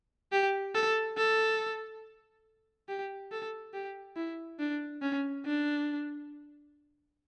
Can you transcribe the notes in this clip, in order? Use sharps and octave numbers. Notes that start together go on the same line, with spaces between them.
G4
A4
A4
G4
A4
G4
E4
D4
C#4
D4